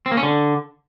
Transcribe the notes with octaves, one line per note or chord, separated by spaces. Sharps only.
C4
A#3
C#4
D3